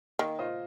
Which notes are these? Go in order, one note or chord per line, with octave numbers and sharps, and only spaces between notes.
D#3 A#3
F4 C5 D#5